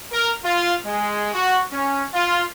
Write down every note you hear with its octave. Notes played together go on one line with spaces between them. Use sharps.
A#4
F4
G#3
F#4
C#4
F4